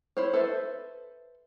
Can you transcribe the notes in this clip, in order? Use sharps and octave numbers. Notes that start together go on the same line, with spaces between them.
E4 C5 C#5
A4 B4 C5 E5